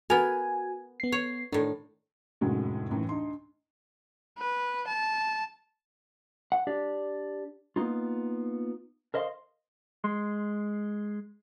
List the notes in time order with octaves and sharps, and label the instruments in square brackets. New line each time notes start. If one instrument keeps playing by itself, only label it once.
[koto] B3 A#4 [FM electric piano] F#4 G#5
[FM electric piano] B3 C7
[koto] C#5
[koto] A2 D#3 [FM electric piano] D4
[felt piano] F1 F#2 A2 D#3 G#3 F#4
F#2 A2 D#3 E3
D2 D#4 C6
[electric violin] B4
A5
[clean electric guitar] F#5
D4 G4 D5
A#3 B3 D#4 F4
A#4 C5 D#5 F5 C6
[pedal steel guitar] G#3 C6